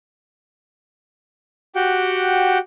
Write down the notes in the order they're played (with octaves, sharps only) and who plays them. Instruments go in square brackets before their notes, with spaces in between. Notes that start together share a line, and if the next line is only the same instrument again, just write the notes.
[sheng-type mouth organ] F#4 G4 F#5 G5